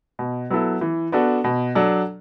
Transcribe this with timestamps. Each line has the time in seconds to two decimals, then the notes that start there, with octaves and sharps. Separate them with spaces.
0.19 B2
0.50 F#3 B3 E4 A4
0.81 E3
1.12 B3 D4 F#4 A4
1.44 B2
1.75 F#3 D4 A4